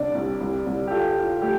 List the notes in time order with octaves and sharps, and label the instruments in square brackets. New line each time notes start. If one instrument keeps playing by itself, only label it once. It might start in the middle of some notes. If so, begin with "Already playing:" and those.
Already playing: [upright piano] C2 C3 D4 D5
C2
C2
C2
G4
F4 A4
F4
A3 G4